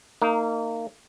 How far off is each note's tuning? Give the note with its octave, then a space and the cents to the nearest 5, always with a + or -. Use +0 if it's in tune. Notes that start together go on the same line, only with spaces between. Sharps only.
A#3 -25 D#4 +0